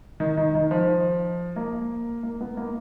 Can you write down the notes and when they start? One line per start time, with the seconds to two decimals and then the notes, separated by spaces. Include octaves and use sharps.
0.20 D#3
0.37 D#3
0.55 D#3
0.71 F3
1.56 A#3
2.23 A#3
2.41 B3
2.57 A#3